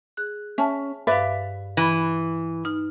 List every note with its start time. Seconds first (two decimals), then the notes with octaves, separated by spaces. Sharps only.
0.17 G#4 F#6
0.58 C#4 E5 G#5 A5
1.07 G2 B4 D5 E5 F5
1.77 E3
2.65 D#4 F6